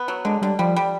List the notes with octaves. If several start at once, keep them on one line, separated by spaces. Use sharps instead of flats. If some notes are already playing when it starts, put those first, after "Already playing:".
Already playing: B3
F#3
D3 G#3
D3 G3
F3 G3
G3